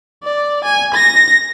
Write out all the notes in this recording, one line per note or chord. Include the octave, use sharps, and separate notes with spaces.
D5
G#5
A#6